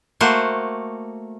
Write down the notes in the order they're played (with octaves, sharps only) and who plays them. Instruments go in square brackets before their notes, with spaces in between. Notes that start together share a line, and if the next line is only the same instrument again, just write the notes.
[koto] A3 A#3 F#4 C5